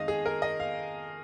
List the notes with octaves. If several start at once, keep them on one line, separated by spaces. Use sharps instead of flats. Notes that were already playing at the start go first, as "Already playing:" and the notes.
Already playing: F2 D#3 G#3 D#5 F5
G#4
A#4
D#5
F5